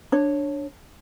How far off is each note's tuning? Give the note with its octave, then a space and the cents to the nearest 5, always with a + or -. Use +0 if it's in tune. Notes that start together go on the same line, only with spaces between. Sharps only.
D4 +0 C#5 -10